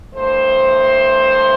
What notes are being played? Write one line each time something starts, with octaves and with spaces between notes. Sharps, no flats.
G2 E3 A3 C5